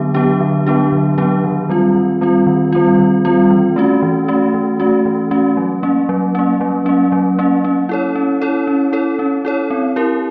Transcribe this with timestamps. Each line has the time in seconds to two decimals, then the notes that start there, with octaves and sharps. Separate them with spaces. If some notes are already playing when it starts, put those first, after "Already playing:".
Already playing: D3 F#3 B3 D4 G4
0.14 F#3 B3 D4 G4
0.40 D3
0.66 F#3 B3 D4 G4
0.92 D3
1.18 F#3 B3 D4 G4
1.44 D#3
1.69 G3 C4 F4
1.95 D#3
2.21 G3 C4 F4
2.46 D#3
2.72 G3 C4 F4
2.99 D#3
3.25 G3 C4 F4
3.50 E3
3.76 A3 C#4 F#4
4.03 E3
4.28 A3 C#4 F#4
4.54 E3
4.80 A3 C#4 F#4
5.06 E3
5.31 A3 C#4 F#4
5.57 F#3
5.83 A#3 C#4
6.09 F#3
6.35 A#3 C#4
6.61 F#3
6.86 A#3 C#4
7.12 F#3
7.39 A#3 C#4
7.64 C#4
7.89 E4 A4 C#5
8.16 C#4
8.41 E4 A4 C#5
8.67 C#4
8.93 E4 A4 C#5
9.19 C#4
9.45 E4 A4 C#5
9.70 C4
9.96 E4 G4 A#4